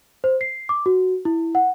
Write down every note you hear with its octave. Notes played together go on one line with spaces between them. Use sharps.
C5
C7
D6
F#4
E4
F#5